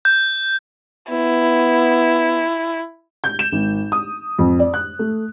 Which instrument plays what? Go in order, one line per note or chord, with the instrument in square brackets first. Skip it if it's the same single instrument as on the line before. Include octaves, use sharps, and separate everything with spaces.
[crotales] G6
[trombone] B3 [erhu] E4
[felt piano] G6
E7
G#1
D#6
F2
D5
F#6
A3